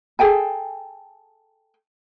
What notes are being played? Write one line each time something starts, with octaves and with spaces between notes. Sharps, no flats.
G#4 A4 G5 G#5